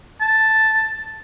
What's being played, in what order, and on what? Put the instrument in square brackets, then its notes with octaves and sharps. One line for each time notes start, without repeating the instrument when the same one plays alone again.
[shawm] A5